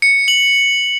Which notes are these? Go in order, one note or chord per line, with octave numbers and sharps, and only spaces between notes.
C#7
F#7